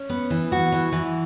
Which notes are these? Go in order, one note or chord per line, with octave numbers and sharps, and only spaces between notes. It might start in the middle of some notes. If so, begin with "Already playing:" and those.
Already playing: C#4
B3
E3
F#4
E3
E3